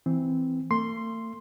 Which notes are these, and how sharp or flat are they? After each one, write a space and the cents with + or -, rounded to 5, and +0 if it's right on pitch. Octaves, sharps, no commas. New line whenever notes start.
E3 +0 C4 -5
A3 +45 C6 +0